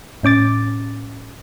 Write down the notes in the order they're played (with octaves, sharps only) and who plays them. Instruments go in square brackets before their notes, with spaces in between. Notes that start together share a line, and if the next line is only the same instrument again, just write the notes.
[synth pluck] A2 C#4 D6 A6